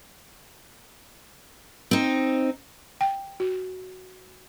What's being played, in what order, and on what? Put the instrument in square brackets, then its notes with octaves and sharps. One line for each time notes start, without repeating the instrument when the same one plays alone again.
[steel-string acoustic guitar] C4 D#4
[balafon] G5
F#4